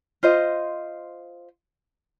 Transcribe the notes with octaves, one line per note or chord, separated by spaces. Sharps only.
F4 C5 D#5